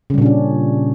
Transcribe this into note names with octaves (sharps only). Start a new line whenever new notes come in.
A#2 C#3 G3 C#4 D4